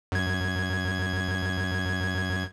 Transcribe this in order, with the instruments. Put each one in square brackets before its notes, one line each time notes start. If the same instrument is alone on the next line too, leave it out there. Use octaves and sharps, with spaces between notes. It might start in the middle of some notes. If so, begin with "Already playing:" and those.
[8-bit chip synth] F#2 G#6